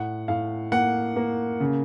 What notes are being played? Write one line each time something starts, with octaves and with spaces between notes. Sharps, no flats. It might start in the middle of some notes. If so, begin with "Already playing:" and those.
Already playing: A2 F#5
A2 F5
A#3 F#5
A#3
C#3